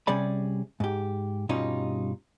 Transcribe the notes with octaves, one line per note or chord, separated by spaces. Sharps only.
C3 G3 C#4 G#4 D5 B5
G#2 G4
G2 B2 G3 C#4 D#4 F4